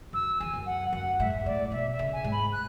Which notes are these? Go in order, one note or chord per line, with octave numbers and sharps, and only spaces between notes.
F#2 E6
E2 G#5
F#2
F#5
F#2 F#5
G#2 E5
A2 D5
B2 E5
E5
C#3
G#5
G#2
B5
F#6